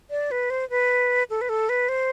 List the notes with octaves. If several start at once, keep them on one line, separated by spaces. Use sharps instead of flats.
D5
B4
C5
B4
A4
B4
A4
B4
C5